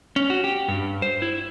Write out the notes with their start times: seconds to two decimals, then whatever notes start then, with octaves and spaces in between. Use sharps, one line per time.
0.16 C#4
0.30 F#4
0.44 G4
0.68 G2
1.02 C5
1.22 E4